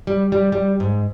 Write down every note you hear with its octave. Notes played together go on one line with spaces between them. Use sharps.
G3
G3
G3
G#2